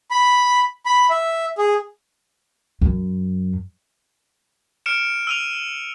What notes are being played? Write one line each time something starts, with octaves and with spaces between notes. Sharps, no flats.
B5
B5
E5
G#4
F#2
F6 C#7 D7 E7
E6 D#7 F7